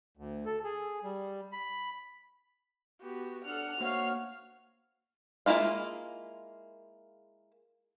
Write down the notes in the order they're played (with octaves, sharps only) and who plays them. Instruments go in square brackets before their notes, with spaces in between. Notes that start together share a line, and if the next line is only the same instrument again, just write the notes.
[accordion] D2
A4
G#4
G3
B5
[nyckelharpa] B3 G4 [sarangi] F#4
[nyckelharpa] D4 A4 [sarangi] F#5 [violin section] F6
[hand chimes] A#3 C5 F#5 [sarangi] F#4 [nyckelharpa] C#5 F5
[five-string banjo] G#3 A#3 E4 F4 F5